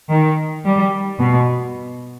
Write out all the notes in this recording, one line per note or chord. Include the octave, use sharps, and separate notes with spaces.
D#3
G3
B2